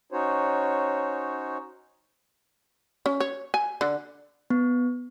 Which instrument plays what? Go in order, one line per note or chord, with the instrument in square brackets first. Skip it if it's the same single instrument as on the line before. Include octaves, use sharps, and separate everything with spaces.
[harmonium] C#4 D#4 F#4 C5 C#5
[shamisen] C#4
C#5
G#5
D3
[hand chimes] B3